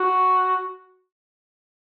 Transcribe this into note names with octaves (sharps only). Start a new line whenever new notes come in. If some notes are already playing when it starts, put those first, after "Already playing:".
Already playing: F#4